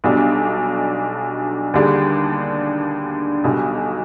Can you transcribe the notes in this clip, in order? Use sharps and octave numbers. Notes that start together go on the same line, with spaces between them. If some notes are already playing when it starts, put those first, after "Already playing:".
B1 B2 G3 D4
D#2 D3 G3 D4 G#4
B1 B2 G3